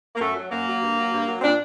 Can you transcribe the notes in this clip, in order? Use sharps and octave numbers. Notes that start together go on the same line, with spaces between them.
A#3
F#2 A3
F#3
F#2 A#3
F#3
G2
F#3
G2
F#3
C4
A#2 D4